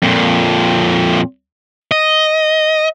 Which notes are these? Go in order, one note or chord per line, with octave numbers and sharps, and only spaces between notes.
F2 A#2
D#5